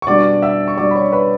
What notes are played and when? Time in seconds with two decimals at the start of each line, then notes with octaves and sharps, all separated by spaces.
0.02 C#6
0.07 B2 G3 D4 D5 D6
0.42 E5 E6
0.68 C#6
0.77 B2 G3 D4 D5 D6
0.91 B5
0.95 C#5 C#6
1.12 B4 B5